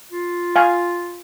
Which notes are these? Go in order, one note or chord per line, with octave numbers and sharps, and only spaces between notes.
F4
F5 G#5